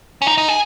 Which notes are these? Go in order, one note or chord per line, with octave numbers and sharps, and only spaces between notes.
C#4
D#4
D#4
G#4